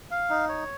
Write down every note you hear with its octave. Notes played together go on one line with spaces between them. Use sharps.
F5
D#4
C#5